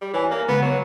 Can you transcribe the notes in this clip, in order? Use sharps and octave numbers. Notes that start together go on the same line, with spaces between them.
G3
E3 C#5 G#5
A#3
C#3 G#3 B3
F#3